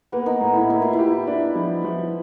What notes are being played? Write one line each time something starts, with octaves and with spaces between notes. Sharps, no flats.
A#3 B3
D#4
A2
E4
A#3 E4
F4
E4
G4
D4
F3
F3